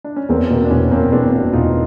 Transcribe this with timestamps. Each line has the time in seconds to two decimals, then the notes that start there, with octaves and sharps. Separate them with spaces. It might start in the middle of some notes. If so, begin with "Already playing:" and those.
0.04 D4
0.16 C#4
0.29 E2 A#3 C4
0.50 B2 A#3 C4
0.64 D4
0.70 E1 B3 C#4
0.91 E1 A#3 C4
1.12 E2 C4 D4
1.34 B2
1.53 E1 D#4 F4